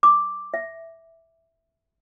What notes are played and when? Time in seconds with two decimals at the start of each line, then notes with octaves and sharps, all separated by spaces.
0.03 D6
0.54 E5